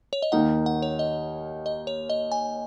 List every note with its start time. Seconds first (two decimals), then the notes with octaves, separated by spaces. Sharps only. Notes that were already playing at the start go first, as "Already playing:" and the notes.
0.13 C#5
0.22 D#5
0.32 D#2 D#3 A#3 D#4 F#5
0.66 F#5
0.82 C#5
0.99 D#5
1.66 D#5
1.87 C#5
2.10 D#5
2.32 G#5